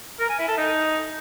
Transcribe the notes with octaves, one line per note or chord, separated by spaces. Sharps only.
A#4
G#5
E4
A4
D#4